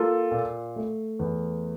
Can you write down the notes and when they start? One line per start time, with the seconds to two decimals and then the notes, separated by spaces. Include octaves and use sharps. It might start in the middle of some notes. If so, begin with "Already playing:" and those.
Already playing: A#3 F4 A4
0.31 A#2
0.76 A3
1.19 E2